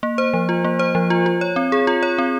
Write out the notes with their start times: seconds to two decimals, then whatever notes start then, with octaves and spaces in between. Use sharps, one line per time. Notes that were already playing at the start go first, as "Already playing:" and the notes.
0.03 A#3
0.18 C5
0.33 F3
0.49 F4
0.64 A#3
0.79 C5
0.95 F3
1.10 F4
1.26 F4
1.41 C#5
1.56 C4
1.72 G#4
1.87 F4
2.03 C#5
2.18 C4